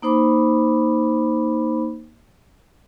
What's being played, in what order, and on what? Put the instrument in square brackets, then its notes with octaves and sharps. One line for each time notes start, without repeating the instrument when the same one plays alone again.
[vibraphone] A#3 D#4 C5 B5 D6